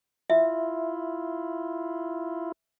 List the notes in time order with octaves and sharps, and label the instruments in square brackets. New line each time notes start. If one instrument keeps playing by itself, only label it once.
[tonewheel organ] E4 F4 [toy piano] E5